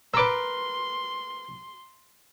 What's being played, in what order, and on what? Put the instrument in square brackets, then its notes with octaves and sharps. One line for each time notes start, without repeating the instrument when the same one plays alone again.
[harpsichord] A#4 B4 [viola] C6 [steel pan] D6 E6